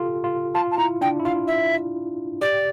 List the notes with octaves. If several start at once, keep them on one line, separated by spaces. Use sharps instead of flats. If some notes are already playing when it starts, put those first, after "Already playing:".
Already playing: F4 G4 A4
F4
F4 A5
A5
E4 A#5
D4 G5
E4
F4 F5
E5
G4 D5